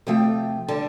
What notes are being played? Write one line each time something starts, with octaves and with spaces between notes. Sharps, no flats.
C3 F3 A3 G5
D3 G3 A5